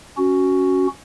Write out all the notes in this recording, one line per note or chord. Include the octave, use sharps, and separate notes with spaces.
C#4 F#4